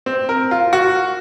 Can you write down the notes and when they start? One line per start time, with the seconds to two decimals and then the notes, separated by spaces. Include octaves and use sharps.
0.06 C4
0.29 A#4
0.51 F4
0.73 F#4